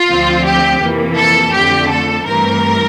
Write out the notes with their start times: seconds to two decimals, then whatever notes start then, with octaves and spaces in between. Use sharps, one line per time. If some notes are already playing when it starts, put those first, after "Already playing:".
Already playing: F4
0.09 D2 D3 F3 C4
0.45 G4
0.81 F2 C3 E3 A#3
1.17 A4
1.53 F2 D3 A3 G4
1.89 A4
2.25 G2 E3 A3 C4 A#4